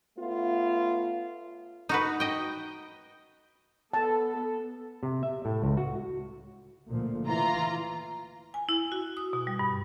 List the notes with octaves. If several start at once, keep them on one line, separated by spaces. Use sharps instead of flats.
A3 B3 C#4 F4
D#4 F#4 B4
D#5 G5
B3 A4 A5
C3
E5
A2
C#2
F#4
D2 A#2 F3
E3 F4 A#5
G#5
E4
F#4
D#6
B2
G3
G2